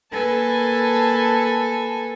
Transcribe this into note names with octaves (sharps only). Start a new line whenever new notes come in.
A#3 A4 B4 G#5 A5